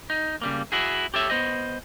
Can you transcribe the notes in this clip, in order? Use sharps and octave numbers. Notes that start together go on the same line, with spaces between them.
D#4
C#3 G3 A#3
E4 F#4 G#4
G4 A4 C#5 E5
B3 C5 D#5